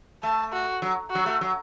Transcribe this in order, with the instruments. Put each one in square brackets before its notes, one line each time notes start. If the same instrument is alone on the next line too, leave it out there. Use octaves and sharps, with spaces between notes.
[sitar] A3 [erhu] A5
[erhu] F#4
[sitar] F#3
[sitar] F#3 [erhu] F#4
[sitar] A3
F#3